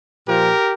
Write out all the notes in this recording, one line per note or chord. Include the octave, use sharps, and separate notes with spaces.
A#2 F3 G4 A#4